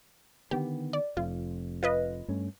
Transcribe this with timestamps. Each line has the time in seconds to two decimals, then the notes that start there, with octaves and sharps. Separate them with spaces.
0.51 D3 D#3 B3 G4
0.93 D5
1.17 F1 F2 F4
1.83 F4 B4 D#5
2.28 G2 A3 C#4